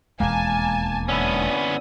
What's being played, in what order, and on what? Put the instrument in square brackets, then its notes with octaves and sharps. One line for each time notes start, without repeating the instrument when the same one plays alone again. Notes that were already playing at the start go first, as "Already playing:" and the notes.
[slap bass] E1 D#2 G#3 [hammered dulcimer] A#3 [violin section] G#5 A5
[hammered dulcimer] D3 E4 [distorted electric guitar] B3 C#4 [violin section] D#6